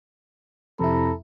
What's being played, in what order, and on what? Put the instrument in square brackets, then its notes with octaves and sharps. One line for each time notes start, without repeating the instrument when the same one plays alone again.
[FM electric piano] F2 E4 [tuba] C3 [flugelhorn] A4 [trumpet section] A#5 B5